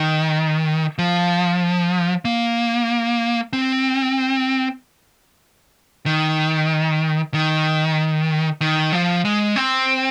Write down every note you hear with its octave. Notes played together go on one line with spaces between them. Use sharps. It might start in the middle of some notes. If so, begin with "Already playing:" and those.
Already playing: D#3
F3
A#3
C4
D#3
D#3
D#3
F3
G#3
C4